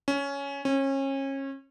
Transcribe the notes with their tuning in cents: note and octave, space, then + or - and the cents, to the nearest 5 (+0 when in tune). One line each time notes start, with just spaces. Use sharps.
C#4 +10
C#4 -30